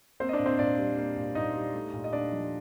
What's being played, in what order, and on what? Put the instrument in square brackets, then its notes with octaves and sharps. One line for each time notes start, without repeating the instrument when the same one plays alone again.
[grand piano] A#3 C4 C5
D#5
D4 D5
A#2
C4 C5
A#2 D4 D5
G3
A#3
A#2
A#2 D#4 D#5
G3
A3
A#2
D#5
A#2 D4 D5
F3